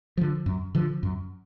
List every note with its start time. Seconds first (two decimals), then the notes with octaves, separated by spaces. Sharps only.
0.17 D3 F3
0.46 F#2
0.75 D3 F3
1.03 F#2